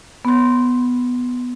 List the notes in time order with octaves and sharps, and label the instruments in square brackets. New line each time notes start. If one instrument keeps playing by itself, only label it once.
[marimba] B3 C6